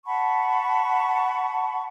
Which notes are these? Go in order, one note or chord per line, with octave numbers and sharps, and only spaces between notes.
F#5 A5 B5 C#6